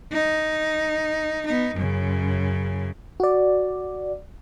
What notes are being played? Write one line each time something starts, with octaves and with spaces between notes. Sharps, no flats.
D#4
B3 D#4
F#2 C#3
F#4 D5